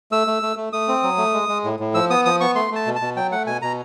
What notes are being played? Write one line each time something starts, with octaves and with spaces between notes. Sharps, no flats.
A3 E6
A3
A3
A3
A3 D#6
C4
F#3
A3
G#3
G#3
A2
A2
F3 E6
B3 D#6
F3 D#6
B3 C#6
A3 C6
A3 A5
B2
A5
B2
F#3 G5
A3 F#5
B2 G#5
B2 A#5